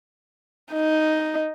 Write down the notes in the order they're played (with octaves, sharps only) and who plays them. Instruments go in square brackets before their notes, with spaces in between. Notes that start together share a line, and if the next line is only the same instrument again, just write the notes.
[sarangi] D#4